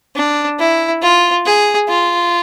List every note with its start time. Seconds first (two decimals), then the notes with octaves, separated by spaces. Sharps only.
0.16 D4
0.59 E4
1.02 F4
1.46 G#4
1.89 F4